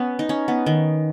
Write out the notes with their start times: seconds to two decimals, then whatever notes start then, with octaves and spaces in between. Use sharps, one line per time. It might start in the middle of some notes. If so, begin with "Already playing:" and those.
Already playing: B3 C#4
0.19 D#4
0.29 C#4
0.48 B3
0.66 D#3